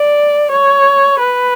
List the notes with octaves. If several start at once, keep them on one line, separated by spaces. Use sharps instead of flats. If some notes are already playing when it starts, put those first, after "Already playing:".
Already playing: D5
C#5
B4